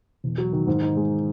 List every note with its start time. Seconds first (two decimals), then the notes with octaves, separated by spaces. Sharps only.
0.24 E1
0.38 F#3
0.53 D#3
0.67 G#2
0.82 D#4
0.96 G#3